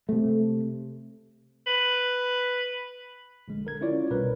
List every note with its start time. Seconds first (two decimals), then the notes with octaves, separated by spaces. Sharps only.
0.09 C3 A3
1.67 B4
3.48 A#1 D3 G#3
3.65 D3 A#4 G#6
3.81 C#4 E4 F4 C#5 D5
4.11 C2 B2 A#4 B4